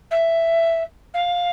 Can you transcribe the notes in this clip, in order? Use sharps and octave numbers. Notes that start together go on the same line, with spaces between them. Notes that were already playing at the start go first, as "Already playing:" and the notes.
E5
F5